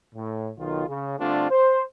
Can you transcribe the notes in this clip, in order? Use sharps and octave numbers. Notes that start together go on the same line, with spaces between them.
A2
B1 D#3 F4
C#3
G2 D3 A3 C4 D4 F4
C5